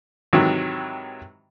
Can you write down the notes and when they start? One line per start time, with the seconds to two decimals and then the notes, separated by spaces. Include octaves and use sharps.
0.33 G#2 C3 D#3 E3 F#3